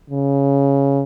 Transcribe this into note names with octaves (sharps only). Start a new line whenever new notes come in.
C#3